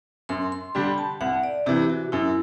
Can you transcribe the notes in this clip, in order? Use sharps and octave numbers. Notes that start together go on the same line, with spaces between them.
F#2 C6
C6
D3 G3 D4 G4 B5
A5
C2 F#5
D5
C3 E3 G4
F#4
F#2 E4